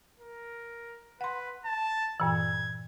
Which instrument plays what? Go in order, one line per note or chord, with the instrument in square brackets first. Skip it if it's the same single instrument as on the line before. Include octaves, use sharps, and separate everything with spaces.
[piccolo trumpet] A#4
[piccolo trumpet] B4 [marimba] F#5 C6
[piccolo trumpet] A5
[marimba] G2 A#2 E3 [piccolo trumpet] G#6